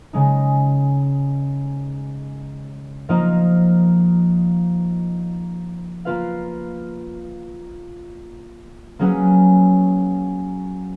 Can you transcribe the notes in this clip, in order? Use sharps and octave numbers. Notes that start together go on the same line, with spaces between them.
C#3 G#3 D#4
F3 A#3 D#4 A#4 D#5
A#3 F4 B4 F5
F#3 A#3 C#4 G#4 B4